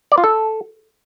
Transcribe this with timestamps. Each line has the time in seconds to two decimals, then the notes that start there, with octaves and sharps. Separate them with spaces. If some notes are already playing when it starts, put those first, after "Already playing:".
0.12 D5
0.18 F4
0.24 A4